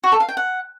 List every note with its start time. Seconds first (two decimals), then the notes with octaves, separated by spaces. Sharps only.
0.04 F#4
0.12 A4
0.20 F5
0.29 G5
0.37 F#5